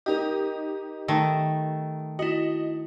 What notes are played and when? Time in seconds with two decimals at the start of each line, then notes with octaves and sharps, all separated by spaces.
0.06 D#4 G4 A#4 D#5
1.08 D#3 A3
2.19 E4 F#4 D#5